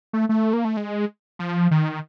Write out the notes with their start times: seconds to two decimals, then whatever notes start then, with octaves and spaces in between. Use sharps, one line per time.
0.13 A3
0.29 A3
0.53 A#3
0.65 A3
0.77 G#3
1.39 F3
1.71 D#3